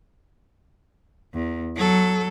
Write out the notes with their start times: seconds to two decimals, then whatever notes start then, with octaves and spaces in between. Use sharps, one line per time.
1.34 E2
1.76 F#3 A4